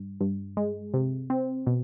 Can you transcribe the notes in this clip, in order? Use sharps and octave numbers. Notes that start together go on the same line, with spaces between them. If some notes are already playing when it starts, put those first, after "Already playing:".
Already playing: G2
G2
G#3
C3
C4
B2